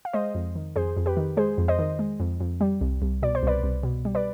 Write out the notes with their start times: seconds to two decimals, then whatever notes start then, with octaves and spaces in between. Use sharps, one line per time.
0.05 F5
0.13 G#3 C5 D#5
0.35 F2
0.55 D#3
0.76 F2 G#4 C5
0.97 F2
1.06 G4 B4
1.17 D#3
1.37 G#3 G#4 C5
1.58 F2
1.68 C5 D#5
1.79 D#3
1.99 G#3
2.20 F2
2.40 F2
2.61 G3
2.81 C2
3.02 C2
3.22 B2 D5
3.35 C5
3.43 C2 B4 D5
3.63 C2
3.83 B2
4.05 G3
4.15 B4 D5